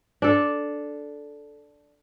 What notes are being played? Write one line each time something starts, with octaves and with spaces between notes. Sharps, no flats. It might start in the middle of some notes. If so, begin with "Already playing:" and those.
D4 A4